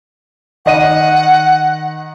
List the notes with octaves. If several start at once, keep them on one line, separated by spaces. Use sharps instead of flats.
D#3 D#5 F#5 D#7